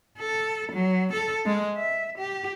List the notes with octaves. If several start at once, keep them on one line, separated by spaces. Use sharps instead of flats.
A4
F#3
A4
G#3
E5
G4